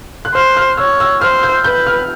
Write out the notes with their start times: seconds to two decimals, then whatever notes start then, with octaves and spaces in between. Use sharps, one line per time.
0.25 F#6
0.34 C5 F6
0.57 F6
0.77 C#5 E6
1.00 E6
1.21 C5 F6
1.43 G6
1.64 B4 G6
1.87 F6